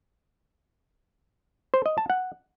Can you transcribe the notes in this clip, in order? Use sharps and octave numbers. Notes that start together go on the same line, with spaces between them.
C5
D#5
A5
F#5